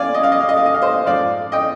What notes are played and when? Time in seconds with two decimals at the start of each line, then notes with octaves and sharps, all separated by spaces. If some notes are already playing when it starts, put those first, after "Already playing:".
Already playing: D5 F5 G#5
0.14 D#5
0.23 F5
0.32 D#5
0.41 F5
0.49 D#5
0.57 F5
0.66 D#5
0.74 F5
0.82 C5 D#5
1.06 G#2 F3 D5 F5
1.52 D#5 G5